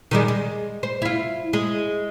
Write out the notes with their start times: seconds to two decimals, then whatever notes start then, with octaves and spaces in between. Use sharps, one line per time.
0.11 D#3 G3 G#3
0.28 G#3
0.83 C5
1.02 E4 F4
1.53 G#3